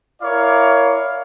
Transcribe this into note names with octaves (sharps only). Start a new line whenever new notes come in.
E4 A#4 C#5 D5 F5